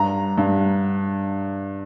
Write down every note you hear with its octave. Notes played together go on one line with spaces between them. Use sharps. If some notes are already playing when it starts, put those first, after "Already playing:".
Already playing: G2 A#5
G2